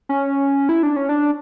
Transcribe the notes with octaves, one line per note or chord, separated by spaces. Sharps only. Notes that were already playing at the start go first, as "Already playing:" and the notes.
C#4
E4
D4
C#4
D4